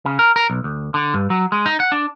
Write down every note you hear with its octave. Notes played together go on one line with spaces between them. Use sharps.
C#3
A#4
A#4
B1
D2
D3
G2
F#3
G#3
D#4
F#5
D4